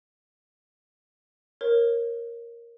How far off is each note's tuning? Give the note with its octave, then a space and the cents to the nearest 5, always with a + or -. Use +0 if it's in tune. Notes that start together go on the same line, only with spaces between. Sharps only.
A#4 +5 C#5 -20